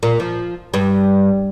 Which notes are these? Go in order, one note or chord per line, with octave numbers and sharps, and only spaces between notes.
A#2
F3
G2